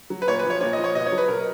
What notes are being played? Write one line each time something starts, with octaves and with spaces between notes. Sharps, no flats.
F#3
B4
A#2 C#5
B4
F3
C#5
A#2 C#5
D#5
F3
C#5
B2 D#5
C#5
F#3
B4
B2 A#4